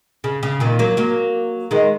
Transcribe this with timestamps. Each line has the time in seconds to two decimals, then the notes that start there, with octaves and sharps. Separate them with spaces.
0.24 C#3
0.43 C#3
0.60 A#2 D#3
0.79 F#3 A#3
0.97 F#3 A#3
1.71 D#3 G#3